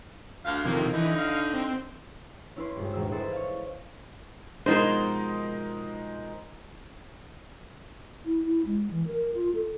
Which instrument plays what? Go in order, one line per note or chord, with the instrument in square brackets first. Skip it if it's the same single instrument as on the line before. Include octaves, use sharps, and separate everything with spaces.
[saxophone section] D2 F5
[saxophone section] F2 A2 A#3 [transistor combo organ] C3 D#3 F3
[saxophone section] D3 D#4 [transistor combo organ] E3
[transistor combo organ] F5
C4
[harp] C#4 E4 B4 C6
G#1 G2
A#1 D#2 G#2 E5
E4 A4 B4 C5 D#5
C#5 F5
[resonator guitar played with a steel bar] B2 F3 C5 [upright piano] G#3 D#4 A#4
[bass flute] E4
E4
G#3
E3
A#4
F4
A4